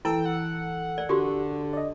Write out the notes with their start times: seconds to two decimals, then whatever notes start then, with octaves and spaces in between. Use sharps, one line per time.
0.05 E3 E4 A4 G5 E6
0.25 F#5
0.98 D5
1.09 D3 F#4 G4
1.73 D5 D#5